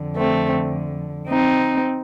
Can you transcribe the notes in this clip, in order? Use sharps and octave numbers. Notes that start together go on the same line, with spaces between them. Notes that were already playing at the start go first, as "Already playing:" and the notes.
Already playing: F2 D3
A3 C4
C4 D#4